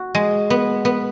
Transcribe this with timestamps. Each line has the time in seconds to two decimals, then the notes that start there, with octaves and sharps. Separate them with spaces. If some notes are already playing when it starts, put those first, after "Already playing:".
Already playing: F#4
0.15 G#3
0.50 B3
0.85 B3